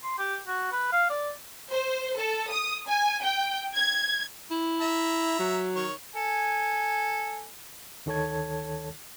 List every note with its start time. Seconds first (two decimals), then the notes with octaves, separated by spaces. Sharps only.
0.03 C6
0.19 G4
0.47 F#4
0.72 B4
0.92 F5
1.10 D5
1.70 C5
2.16 A4
2.51 D#6
2.87 G#5
3.22 G5
3.75 G#6
4.51 E4
4.81 E5 A#5
5.39 F#3
5.76 D#3 C#5
6.16 A4 G#5
8.06 D2 D#3 A4 C#5 A5 G#6